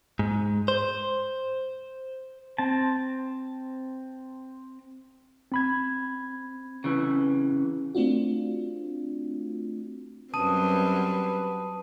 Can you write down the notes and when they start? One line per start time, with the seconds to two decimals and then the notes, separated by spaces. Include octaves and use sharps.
0.19 G#2
0.68 C5
2.58 C4 A5
5.52 C4 B5 G#6
6.84 C#3 E3
7.95 A3 C4 D4 F4 F#4
10.34 F#2 G3 C4 B4 A5 D#6 D#7